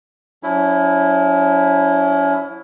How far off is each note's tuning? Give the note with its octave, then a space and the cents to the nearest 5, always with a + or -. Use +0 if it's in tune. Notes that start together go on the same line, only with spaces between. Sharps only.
F#3 -45 C#4 +35 E4 +0